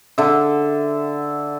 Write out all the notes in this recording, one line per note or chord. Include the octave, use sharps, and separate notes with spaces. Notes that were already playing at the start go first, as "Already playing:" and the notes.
D3 E5